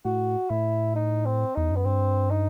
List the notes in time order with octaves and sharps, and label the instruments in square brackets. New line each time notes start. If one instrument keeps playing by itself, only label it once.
[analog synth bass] A2 [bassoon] F#4
[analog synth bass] A2 [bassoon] E4
[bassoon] D#4
C4
[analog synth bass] E2 [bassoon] D#4
[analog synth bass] F#2 [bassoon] B3
[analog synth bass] G2 [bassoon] C4
[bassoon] D#4